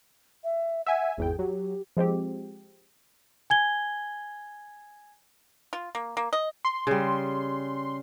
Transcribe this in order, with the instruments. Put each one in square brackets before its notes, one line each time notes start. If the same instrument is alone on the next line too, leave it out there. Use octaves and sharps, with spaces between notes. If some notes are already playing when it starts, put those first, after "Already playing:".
[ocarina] E5
[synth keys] E5 G#5 [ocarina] F#5
[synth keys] G#1 E2 G5 [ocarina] G#4
[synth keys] F#3 [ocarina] G4
[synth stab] F3 G#3 C4 G4
[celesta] G#5 G#6 G7
[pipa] F4
A#3
A#3
D#5
[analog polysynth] C6
[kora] C#3 G3